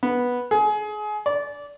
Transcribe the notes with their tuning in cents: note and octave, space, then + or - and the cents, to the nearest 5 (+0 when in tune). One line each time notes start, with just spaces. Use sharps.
B3 -10
G#4 +25
D5 -20